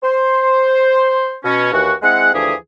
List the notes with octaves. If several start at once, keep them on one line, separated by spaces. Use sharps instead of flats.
C5
B2 C#4
D#2 E3 F#4
G#3 C4 E4 G#4 F#5
D2 D3 E3 F3 G4 G#4